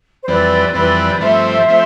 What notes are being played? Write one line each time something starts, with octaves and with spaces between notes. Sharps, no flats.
C5
F2 E3 G3 C4 B4 D5
F2 E3 G3 C4 B4 D5
G2 F3 A3 C4 C5 E5
F3 A3 C4